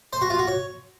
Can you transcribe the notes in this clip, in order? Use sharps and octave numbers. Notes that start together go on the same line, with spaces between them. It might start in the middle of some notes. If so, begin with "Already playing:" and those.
C5
F#4
F4
F#4
C#5